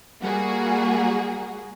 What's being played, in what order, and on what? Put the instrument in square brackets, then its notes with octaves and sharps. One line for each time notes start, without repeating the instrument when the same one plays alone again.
[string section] G3 A#3 F#4 G#4